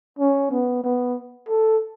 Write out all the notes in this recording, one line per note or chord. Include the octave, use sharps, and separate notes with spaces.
C#4
B3
B3
A4